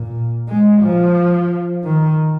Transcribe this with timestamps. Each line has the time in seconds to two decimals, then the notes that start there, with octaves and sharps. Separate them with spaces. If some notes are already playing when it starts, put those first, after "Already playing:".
Already playing: A#2
0.49 G#3
0.82 F3
1.84 D#3